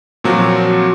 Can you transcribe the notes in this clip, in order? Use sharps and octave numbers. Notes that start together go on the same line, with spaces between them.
A#2 F3 F#3 C4 F#4